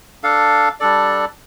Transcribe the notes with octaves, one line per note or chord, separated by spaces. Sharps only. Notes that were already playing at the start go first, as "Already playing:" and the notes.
D4 A4 F5
G3 D4 A4 D5